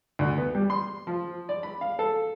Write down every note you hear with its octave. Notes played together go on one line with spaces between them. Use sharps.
D2
B3
G3
C6
F3
D5
B5
F5
A4